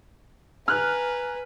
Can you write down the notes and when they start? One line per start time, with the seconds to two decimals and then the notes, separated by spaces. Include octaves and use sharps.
0.68 B4 G#5 A#5 F6 F#6